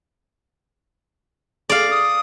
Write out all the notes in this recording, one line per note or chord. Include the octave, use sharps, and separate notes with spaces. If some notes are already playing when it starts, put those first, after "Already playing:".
G#4 D5 F5
D#6